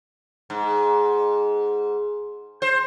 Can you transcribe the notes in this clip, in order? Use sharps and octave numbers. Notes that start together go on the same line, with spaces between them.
G#2
C5